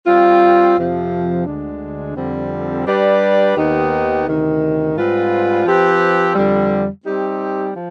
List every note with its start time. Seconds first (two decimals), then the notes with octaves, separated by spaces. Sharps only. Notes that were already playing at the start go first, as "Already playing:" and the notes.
0.07 G3 C4 F4
0.76 F2 C3 F3
1.46 D2 D3 G#3 D4
2.16 F2 D3 G3 C4
2.86 G3 D4 G4 B4 D5
3.55 D#2 D#3 B3 D#4 G4
4.26 D2 C3 D#3
4.95 G#2 G3 C4 F4 B4
5.65 F3 C4 G4 B4
6.35 F2 D3 G3
7.05 G3 C4 D#4 G4
7.74 F3